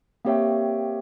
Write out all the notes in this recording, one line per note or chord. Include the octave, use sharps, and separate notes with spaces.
A#3 C4 G4 C#5 E5 G5